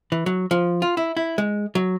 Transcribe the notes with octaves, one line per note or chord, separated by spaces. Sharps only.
E3
F#3
F3
F4
E4
E4
G#3
F#3